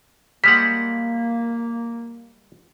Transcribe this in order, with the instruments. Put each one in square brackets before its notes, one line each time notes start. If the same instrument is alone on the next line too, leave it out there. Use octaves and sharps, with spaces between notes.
[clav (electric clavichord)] G3 G#3 F#5 [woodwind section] A#3 [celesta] B6